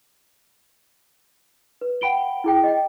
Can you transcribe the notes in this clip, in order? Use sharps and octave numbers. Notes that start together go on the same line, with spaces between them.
B4
F#5 G5 B5 D7 G7
E4 G#4 G5
D#5 G5